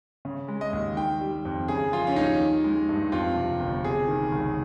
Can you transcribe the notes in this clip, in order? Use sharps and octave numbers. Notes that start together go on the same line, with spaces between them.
C#3
G#3
D#5
D#2
D#3 G5
G3
F2
C#3 G#4
F3 F4
C#4
D#2 D#4
D#3
G#3
G2
F2 F4
C3
G1
C3 G#4
D#3
C#2